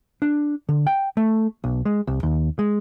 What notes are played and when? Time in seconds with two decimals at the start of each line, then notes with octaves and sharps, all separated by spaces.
0.22 D4
0.69 D3
0.87 G5
1.17 A3
1.64 B1
1.85 G#3
2.07 C2
2.23 D#2
2.59 G#3